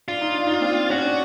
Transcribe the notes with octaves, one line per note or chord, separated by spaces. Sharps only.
D4 F4
D#4
D4
D#4
C4 D4
C#4 F#4
D4